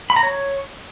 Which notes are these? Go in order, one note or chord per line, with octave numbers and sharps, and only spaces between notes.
B5
A#5
C#5